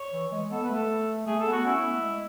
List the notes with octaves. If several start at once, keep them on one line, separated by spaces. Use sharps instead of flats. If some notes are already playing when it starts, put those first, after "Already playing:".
Already playing: C#5
E3
G#3
B3 A4
B4
A3
A4
A3 G#4
A4
B3
F#4
C#4 E4
B3
A3
G#3